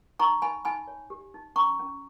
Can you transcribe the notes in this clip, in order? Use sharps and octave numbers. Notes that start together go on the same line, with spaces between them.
D#4 A#5 C#6
D#4 G#5 B5
D#4 G#5 B5
C#5
G4
D#4
C#4 A#5 C#6
C#4